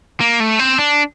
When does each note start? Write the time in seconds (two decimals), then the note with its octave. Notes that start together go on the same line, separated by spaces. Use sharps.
0.21 A#3
0.40 A3
0.59 C4
0.78 D4